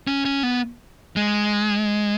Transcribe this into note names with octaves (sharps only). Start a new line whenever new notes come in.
C#4
C#4
B3
G#3